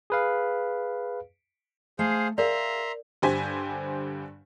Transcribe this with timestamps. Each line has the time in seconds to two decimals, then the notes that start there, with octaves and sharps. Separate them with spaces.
0.10 G#4 B4 F5
1.99 A3 G#4 C5 F5
2.38 G#4 A#4 D5 E5 F5 A#5 C6
3.22 G2 D3 G4 C5 G#5 B6